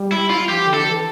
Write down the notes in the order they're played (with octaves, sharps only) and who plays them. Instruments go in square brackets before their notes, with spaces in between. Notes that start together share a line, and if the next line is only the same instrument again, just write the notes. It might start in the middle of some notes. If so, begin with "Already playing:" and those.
Already playing: [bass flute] G3
[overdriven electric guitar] E4
F4
[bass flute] F3 [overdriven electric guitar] G4
[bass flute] D3
[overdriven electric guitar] A4
[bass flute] E3